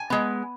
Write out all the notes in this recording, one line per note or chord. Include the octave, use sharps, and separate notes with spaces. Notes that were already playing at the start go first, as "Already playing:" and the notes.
Already playing: G#5
G#3 B3